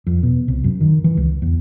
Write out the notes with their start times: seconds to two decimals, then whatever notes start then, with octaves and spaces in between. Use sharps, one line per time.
0.07 F2
0.23 B2
0.48 C2
0.64 F#2
0.81 D#3
1.04 E3
1.17 C#2
1.42 E2